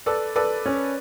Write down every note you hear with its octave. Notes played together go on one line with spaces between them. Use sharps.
A4 B4 D5
A4 B4 D5
C#4